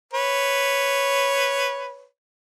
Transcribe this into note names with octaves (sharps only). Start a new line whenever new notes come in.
B4 C#5